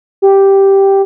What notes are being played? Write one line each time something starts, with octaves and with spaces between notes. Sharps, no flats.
G4